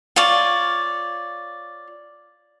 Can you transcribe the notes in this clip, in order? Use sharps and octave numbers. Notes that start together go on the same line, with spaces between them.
F4 C#5 D5